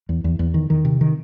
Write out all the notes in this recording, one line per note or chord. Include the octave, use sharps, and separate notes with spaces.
E2
E2
E2
D#3
D#3
C3
D#3